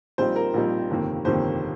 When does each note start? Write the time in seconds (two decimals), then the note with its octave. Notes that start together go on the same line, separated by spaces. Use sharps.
0.18 A#1 A#2 G3 C4 D#4 C5
0.36 A#4
0.54 A#1 A#2 G3 C4 D#4
0.90 G1 F2 C3 D#3 A#3
1.25 G1 F2 C3 D#3 A#3 C5